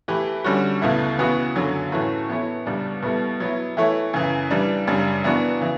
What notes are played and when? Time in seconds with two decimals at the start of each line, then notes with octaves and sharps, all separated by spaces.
0.08 E3 A3 E4 G4 B4
0.44 D3 G3 C#4 F#4
0.82 C#2 B2 A3 E4
1.19 C#3 E3 B3 F#4
1.56 F#2 D3 F#3
1.92 A2 E3 A3 C#4 F#4
2.29 E3 B3 E4 A4 C#5
2.66 C#2 B2 G3 B3 D4
3.02 B2 G3 B3 E4 A4
3.40 F#3 B3 E4
3.77 E3 A3 E4 A4 C#5
4.13 F#2 C#3 E3
4.51 E3 G3 D4
4.87 F#2 C#3 G3 D4
5.24 E3 B3 D4 F#4
5.61 C#3 E3